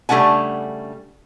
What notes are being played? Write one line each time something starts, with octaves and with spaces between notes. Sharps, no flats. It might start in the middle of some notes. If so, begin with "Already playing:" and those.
C#3 G3 A3 D4 F#5 G#5